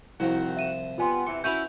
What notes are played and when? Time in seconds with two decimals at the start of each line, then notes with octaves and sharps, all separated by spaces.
0.20 C2 D#3 F3 C4 E4 F#4
0.57 E5 D#7 E7
0.98 G3 B3 F4 G#5 C6
1.27 C3 E3 C6 C#7
1.44 C#4 E4 F#4 B4 G6 D#7 F7